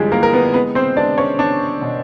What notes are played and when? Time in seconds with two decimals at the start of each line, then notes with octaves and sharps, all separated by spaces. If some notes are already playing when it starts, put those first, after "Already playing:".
Already playing: G1 E3 F3 G3 G#3 G4 G#4
0.12 E3 A#3 A#4
0.23 A#4
0.33 B3 B4
0.54 G#3 B3 B4
0.75 C4 C5
0.97 G#3 D4 D5
1.18 C#4 C#5
1.39 B3 D4 D5
1.82 B2